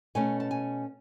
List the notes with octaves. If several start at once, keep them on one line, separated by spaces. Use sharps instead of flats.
B2 A3 C#4 G#5
A5
G#5